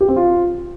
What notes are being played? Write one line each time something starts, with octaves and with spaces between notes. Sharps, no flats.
G4
C4
F4